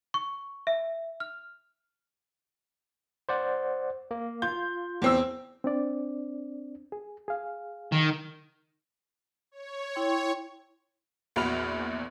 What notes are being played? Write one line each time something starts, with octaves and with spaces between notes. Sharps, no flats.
C#6
E5
F6
C5 D5 F#5
A#3
F4 G6
E2 C4 E6
C4 D4 D5
G#4
G#4 F5
D#3
C#5
E4 G5 C6
A#1 E2 F#4 B5 F6 F7